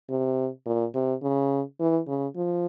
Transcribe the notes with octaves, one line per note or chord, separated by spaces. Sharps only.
C3
A#2
C3
C#3
E3
C#3
F3